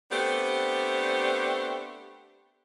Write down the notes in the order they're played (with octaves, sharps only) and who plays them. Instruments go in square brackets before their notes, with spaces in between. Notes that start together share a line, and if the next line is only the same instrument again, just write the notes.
[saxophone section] A3 B3 C4 D4 G4 C5